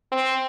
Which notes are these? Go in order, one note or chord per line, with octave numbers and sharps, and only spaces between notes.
C4